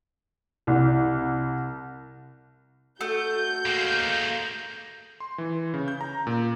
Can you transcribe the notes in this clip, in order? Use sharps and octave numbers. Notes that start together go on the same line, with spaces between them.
C2
A3 F#4 G6
G#3 A#3
C6
E3
C#3
G6
A#5
A#2